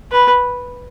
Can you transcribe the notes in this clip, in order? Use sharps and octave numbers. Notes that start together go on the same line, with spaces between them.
B4